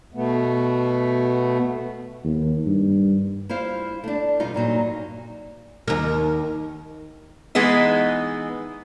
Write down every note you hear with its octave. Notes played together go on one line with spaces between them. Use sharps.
B2 A3 B3
D#2
G2
E4 F4 C5 F5
A3 D4
F2 B2 G3 D#4 F4
G2 A#2 F#3 D#4
D#2 A#4
E3 G#3 B3 D#4